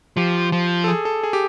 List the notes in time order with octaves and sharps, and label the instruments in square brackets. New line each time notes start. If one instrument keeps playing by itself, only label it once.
[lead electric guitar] F3 [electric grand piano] G4
[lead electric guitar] F3
[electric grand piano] A4
G#4
A4
G#4
G4